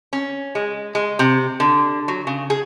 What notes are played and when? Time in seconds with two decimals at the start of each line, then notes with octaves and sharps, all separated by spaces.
0.13 C#4
0.55 G#3
0.95 G#3
1.19 C3
1.60 D3
2.08 F#3
2.27 C#3
2.50 G#4